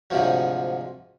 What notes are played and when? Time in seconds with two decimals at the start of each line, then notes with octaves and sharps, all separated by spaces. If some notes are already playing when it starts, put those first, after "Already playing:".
0.10 D2 G#2 C3 F3 F#3